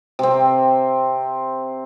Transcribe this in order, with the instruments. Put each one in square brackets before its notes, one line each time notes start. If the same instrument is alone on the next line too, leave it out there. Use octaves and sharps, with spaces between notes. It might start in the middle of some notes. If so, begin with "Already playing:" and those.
[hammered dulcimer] C3 C4